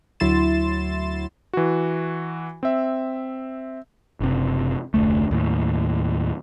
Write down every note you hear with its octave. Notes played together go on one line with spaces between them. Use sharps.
D2 F#3 E4 C6 A6 E7
E3 F#4
C4 E5
F#1 C3
F1 D2 A3
D#2 A2